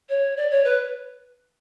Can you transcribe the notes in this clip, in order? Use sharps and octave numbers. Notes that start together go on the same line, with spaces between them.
C#5
D5
C#5
B4